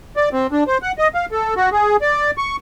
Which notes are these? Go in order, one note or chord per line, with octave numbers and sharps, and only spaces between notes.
D5
C4
D4
C5
F#5
D#5
F5
A4
F#4
G#4
D5
C#6